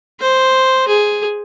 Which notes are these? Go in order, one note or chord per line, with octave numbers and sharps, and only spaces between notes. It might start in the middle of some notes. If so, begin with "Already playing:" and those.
C5
G#4